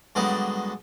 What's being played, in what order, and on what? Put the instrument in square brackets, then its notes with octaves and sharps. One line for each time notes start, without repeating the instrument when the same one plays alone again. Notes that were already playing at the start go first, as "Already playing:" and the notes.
[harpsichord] G2 D3 F#3 G#3 B3